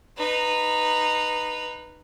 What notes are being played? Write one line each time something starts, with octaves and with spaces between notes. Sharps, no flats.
D#4 B4